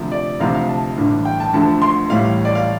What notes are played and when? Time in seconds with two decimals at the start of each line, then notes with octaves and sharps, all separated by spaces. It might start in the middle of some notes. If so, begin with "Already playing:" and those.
Already playing: D2 C3 F3
0.12 D5
0.40 D2 C3 F3 F5
0.55 F5
0.69 A5
0.97 A1 G2 D3
1.25 G5
1.40 A5
1.54 D2 D3 F3 A5
1.82 C6
2.10 A1 A2 G3 F5
2.45 D5
2.55 F5